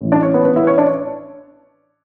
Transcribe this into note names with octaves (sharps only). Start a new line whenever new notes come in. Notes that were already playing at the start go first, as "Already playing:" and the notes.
A1 A2 E3
D4 D5
C#4 C#5
B3 B4
B3 B4
E4 E5
B4
C#4 C#5
D4 D5